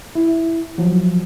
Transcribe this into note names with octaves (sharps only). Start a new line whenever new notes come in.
E4
F3 F#3